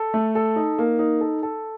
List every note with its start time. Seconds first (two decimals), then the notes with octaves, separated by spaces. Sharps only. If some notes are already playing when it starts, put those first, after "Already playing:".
Already playing: A4
0.14 A3
0.35 A4
0.56 D#4
0.78 A#3
0.99 D#4
1.21 A4
1.43 A4